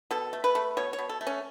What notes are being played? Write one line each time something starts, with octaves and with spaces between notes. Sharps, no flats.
B2 A4
A3
B4
A3
B2 C#5
C#5
B2
A4
A3
C#4